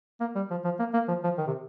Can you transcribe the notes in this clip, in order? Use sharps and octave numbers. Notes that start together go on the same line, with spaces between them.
A#3
G3
F3
F3
A#3
A#3
F3
F3
D#3
C3